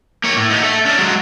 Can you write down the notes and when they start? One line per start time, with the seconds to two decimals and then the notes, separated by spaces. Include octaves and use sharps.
0.24 A#3 C#5
0.37 A2
0.50 B3 D#4
0.63 A4 E5
0.85 C#4 D4
0.99 F#3 G#3